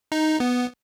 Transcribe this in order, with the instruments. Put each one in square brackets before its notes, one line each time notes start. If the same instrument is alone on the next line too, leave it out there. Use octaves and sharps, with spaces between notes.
[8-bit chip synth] D#4
B3